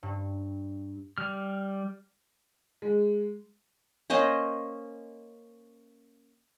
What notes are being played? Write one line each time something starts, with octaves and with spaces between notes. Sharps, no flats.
G2
G3 F6
G#3
A#3 C#4 C5 D#5